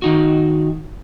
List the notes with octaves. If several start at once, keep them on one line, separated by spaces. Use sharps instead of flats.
D#3 D#4 F#4